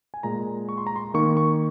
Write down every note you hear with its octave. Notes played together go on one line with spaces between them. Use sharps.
G#5
A#2 G#3 A#5
C#6
C6
A#5
C6
D#3 A#3 C#6
C#6